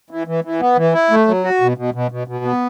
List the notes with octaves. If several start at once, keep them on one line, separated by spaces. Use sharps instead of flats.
E3
E3
E3
B3
E3
E4
A3
F#3
F#4
B2
B2
B2
B2
B2
B3